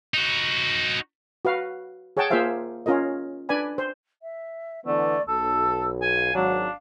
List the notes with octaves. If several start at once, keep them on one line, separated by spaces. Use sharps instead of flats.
D#4 F#4
F#4 B4 F5
G#4 C#5 F#5 G5 A5
A#3 F4 G#4 C5 E5 F5
C#4 F4 A#4 D#5
D4 B4 D5 G#5 B5
C5
E5
D3 E3 A3 B3 D5
B1 A4 E6
F5 G#5
G#1 F#3 D4